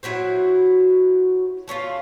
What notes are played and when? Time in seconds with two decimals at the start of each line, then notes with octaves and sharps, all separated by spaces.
0.03 F#3 E4 F#4 C5
1.68 A3 C#4 E4 F4